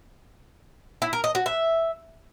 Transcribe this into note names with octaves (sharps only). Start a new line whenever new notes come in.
E4
A#4
D#5
F#4
E5